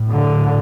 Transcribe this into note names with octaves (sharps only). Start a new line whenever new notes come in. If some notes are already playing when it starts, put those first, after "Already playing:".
Already playing: A2
D3